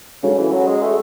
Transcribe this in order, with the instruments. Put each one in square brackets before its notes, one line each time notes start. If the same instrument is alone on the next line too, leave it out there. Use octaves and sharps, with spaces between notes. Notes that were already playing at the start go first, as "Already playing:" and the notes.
[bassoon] C#3 [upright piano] G#3 C#4 F#4 A4 C#5
[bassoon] E3
F#3
G#3
A3